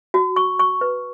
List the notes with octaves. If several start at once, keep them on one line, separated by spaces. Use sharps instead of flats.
F#4
C#6
C#6
B4